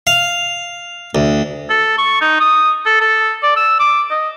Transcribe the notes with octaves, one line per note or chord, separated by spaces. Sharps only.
F5
D2
A4
C#6
D#4
D#6
A4
A4
D5
E6
D6
D#5